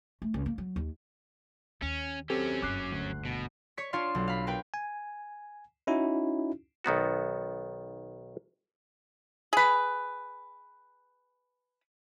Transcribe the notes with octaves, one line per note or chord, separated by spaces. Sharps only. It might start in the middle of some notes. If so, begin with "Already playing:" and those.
A3
C#2
A#3
F#3
D#2
D#2 C#4
F#3 C4 C#4 G4 A4
F#1 G2 D6 F#6 C7
D2
B2
C#5 C#6 B6
D4 F4 C#5 D5 F5 C6
B1
F5 B5
A#4 B4 G5 B5
G#5
C#4 D#4 E4 F#4
B1 D#3 B3 F#4
G#4 B4